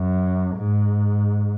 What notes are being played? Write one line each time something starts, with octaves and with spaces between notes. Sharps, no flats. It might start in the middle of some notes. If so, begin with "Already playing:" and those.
Already playing: F#2
G#2